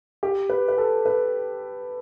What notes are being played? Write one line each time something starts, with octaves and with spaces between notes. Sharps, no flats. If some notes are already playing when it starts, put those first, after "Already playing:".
G4
B4
B4
A4
B4